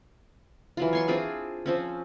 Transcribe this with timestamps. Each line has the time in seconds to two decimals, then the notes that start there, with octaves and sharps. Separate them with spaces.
0.77 E3 F#3 F4
0.93 C#5 C6 C#6
1.08 C4 D4 F4 G#4
1.66 F3 C4 C#4